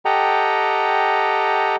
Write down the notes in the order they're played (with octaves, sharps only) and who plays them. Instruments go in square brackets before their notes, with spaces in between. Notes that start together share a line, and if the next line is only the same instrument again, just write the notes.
[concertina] G4 A4 D#5 F#5 G5 A#5